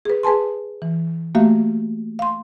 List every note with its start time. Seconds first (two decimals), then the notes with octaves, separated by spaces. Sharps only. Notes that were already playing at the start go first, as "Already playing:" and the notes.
0.05 G#4 B4
0.23 G#4 B4 G#5 A5 C6
0.82 E3
1.35 A3 A#3 F#4 G4 E5 F5
2.19 F5 C6